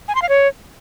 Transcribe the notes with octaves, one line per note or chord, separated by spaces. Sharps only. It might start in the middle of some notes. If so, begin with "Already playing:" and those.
G#5
C6
F5
C#5